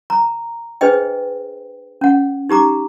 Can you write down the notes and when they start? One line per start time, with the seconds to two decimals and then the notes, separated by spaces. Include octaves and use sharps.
0.10 A#5
0.81 D4 G#4 B4 C5 D#5 G5
2.01 C#4 F#5
2.49 D#4 G4 A#5 D6